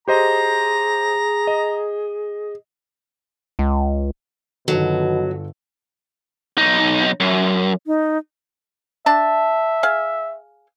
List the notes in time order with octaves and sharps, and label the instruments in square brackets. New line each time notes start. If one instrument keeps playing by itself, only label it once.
[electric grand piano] G4 C5 D#5 [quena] G#4 [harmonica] A#5
[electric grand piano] D#5
[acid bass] C#2
[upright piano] G1 A4 [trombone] B2 [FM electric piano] D#3 F#4 [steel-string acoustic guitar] F#3
[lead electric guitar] B1 D#4
F#2
[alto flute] D#4
[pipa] D4 A5 [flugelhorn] E5
[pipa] G#4 F5